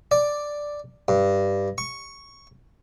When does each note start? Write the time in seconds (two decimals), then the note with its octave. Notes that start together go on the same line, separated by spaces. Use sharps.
0.11 D5
1.08 G2
1.78 C#6